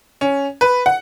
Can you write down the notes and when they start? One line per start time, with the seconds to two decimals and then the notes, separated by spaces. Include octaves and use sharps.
0.21 C#4
0.61 B4
0.86 F#5